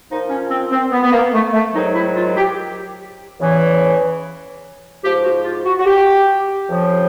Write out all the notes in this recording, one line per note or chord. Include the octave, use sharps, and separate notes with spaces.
A#2 F3 D#4
C#4
C4
C4
B3
B3
A#3
A3
A3
G#2 D#3 F#3 D#4
E4
F4
G4
E2 C#3 E3
G#2 F3 G4
F#4
F4
F#4
F#4
G4
F2 C#3 F3